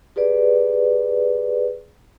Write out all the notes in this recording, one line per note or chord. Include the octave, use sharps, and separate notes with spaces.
G4 G#4 B4 D5